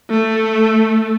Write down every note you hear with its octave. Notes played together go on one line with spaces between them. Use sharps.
A3